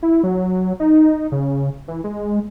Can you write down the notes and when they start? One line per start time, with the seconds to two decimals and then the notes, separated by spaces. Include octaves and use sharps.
0.02 E4
0.23 F#3
0.80 D#4
1.32 C#3
1.88 E3
2.04 G#3